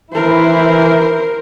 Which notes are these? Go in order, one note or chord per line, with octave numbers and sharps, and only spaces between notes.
E3 E4 A#4 C5